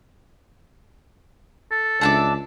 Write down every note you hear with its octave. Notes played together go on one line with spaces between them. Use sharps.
A4
C#2 D4 E5 D6